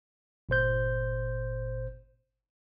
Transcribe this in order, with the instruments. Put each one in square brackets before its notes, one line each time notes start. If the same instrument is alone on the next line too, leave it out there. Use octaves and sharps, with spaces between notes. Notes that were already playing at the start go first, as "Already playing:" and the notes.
[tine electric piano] G1 A#2 C5 G6